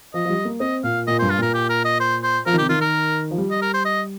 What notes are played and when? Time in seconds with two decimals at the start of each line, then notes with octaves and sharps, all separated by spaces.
0.14 F3 D#5
0.25 F3
0.30 G3
0.45 A#3
0.60 C4 D#5
0.83 A#2 F5
1.07 A#2 D#5
1.19 C5
1.22 G2
1.30 F4
1.38 A#2 A#4
1.54 G4
1.69 A#4
1.85 D#5
2.00 C5
2.23 C5
2.46 F3 A#4
2.53 D#3
2.58 C3 G4
2.69 D#3 F4
2.81 A#4
3.31 F3
3.38 G3
3.51 D#5
3.62 A#4
3.74 C5
3.85 D#5